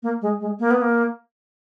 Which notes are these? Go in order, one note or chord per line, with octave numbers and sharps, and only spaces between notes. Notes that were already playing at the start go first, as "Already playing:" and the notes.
A#3
G#3
G#3
A#3
B3
A#3